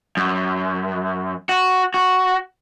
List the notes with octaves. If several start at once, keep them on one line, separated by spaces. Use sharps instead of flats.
F#2
F#4
F#4